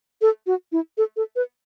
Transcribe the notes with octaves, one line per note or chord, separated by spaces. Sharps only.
A4
F#4
E4
A4
A4
B4